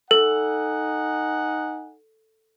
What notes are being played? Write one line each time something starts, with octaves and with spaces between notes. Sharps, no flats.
D#4 A4 F#5 G#5